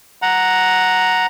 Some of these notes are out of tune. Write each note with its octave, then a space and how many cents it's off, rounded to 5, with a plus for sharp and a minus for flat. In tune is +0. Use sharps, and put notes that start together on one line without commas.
F#5 -5 A#5 +0